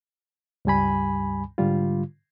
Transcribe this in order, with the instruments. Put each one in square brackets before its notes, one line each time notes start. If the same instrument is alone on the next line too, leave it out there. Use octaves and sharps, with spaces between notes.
[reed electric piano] C#2 G2 G3 G#5 B5
G#2 D3 G3 F4